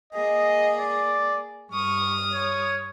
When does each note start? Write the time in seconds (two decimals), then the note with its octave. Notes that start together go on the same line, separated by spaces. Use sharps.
0.13 A#3 G#4 D#5
0.79 D5
1.72 G2 C#6 D#6 F6
2.33 C#5